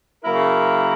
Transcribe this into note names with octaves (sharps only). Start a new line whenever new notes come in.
C#3 F#3 A#3 E4 A#4